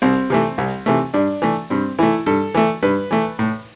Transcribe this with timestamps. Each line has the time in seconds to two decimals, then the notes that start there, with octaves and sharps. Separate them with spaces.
0.02 C2 C4
0.30 C3 E3 A3
0.58 C2
0.86 C3 E3 A3
1.14 G2 D4
1.42 E3 A3
1.70 G2 C4
1.99 E3 A3 E4
2.26 G2 A4
2.55 E3 A3
2.83 G2 B4
3.11 E3 A3
3.39 A2